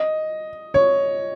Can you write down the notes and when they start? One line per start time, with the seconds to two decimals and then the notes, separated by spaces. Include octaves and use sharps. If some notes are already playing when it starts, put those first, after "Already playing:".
Already playing: D#5
0.74 C#5